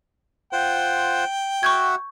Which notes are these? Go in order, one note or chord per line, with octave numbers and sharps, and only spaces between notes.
F4 C5 F#5 G5
F#4 E5 F#5 C#6 G6 G#6